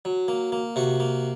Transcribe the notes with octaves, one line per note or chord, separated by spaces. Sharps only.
F#3
A#3
A#3
C3 F#4
A#3